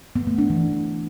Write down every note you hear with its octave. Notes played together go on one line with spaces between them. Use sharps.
B3
A3
D4
E3